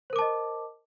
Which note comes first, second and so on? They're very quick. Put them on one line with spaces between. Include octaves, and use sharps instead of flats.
C5 A#4 D6 A5 D#5